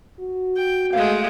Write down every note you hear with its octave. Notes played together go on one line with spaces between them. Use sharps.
F#4
G5
G#3 A3 F5